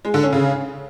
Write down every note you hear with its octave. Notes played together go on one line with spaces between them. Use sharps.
G#3
D3
C#4
C#3